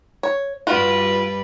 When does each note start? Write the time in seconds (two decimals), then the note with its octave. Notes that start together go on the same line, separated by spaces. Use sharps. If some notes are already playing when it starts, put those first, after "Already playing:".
0.23 C#5
0.67 G2 G3 F4 F#4 B4